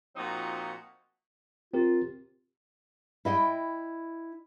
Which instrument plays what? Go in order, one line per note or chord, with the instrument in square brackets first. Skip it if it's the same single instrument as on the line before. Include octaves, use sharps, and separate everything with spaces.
[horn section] A#2 F3 C4 D#4 F#4
[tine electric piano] C4 G4 A#4 [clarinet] F4
[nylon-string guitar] E4 D#5 F5 G5